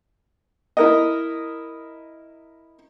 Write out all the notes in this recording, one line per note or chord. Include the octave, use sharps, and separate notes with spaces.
E4 A#4 D#5